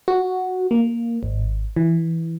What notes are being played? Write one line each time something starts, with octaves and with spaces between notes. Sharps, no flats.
F#4
A#3
G#1
E3